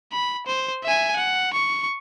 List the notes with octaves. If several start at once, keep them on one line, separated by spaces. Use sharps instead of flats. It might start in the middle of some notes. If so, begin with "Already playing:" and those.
B5
C5
E5 G#5
F#5
C#6